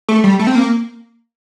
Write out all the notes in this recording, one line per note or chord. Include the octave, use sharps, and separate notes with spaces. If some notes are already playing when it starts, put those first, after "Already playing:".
A3
G3
A3
C4
A#3